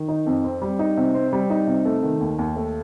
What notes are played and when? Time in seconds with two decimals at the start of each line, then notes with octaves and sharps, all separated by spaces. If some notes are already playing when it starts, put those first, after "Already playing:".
Already playing: D#3
0.08 D#4
0.26 F2
0.44 C4
0.62 G3
0.79 D#4
0.97 C3
1.14 C4
1.33 G3
1.50 D#4
1.67 C3
1.85 A3
2.03 D#3
2.21 D#2
2.39 D#2
2.56 A3